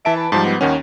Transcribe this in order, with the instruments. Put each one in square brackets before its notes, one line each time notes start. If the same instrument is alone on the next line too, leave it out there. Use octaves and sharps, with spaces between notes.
[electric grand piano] E3 A5 D7 [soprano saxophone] E5
[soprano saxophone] B4
[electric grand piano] G#2 F3 G3 [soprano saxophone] A5
[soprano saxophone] B3
[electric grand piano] D#2 D#3 C#4 [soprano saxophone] F#5